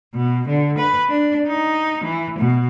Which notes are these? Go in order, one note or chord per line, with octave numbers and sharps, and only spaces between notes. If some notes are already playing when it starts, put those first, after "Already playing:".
B2
D3
B4
D4
D#4
E3
B2